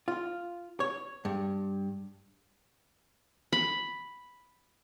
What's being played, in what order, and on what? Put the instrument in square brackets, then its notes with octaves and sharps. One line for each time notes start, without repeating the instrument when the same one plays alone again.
[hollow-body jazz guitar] F4
C#5
G2
[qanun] B5